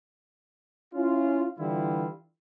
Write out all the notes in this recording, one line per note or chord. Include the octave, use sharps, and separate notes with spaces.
C#4 E4 F4
D3 E3 G3 E4 F4